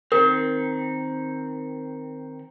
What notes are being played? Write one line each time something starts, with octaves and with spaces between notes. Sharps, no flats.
D#3 C4 A#4